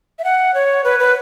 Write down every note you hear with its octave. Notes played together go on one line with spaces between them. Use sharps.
E5
F#5
C#5
B4
B4